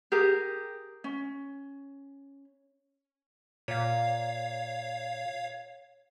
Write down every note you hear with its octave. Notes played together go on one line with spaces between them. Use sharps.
G4 G#4 A#4
C#4
A#2 C#5 F5